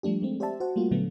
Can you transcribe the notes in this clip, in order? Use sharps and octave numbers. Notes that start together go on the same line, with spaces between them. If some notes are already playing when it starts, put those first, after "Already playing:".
F3 G3 A3 D4 G4
G#3 A3 C4
G4 C5 D5 E5 A5
F#4 C5 F#5
G3 A3 A#3 F4 F#4
A#2 D3 F#3 A3 B3